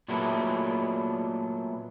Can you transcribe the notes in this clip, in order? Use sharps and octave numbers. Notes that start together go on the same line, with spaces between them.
A#2 F#3 G#3 A3 B3 E4